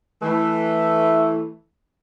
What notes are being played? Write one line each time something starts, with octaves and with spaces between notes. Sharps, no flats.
E3 A3